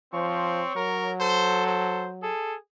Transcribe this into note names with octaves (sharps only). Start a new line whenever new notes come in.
F3 C4 C#5
F#3 A#4
A4 C5
C5
G#4 A4